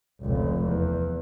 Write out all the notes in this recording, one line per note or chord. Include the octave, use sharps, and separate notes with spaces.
F1 C#2
E2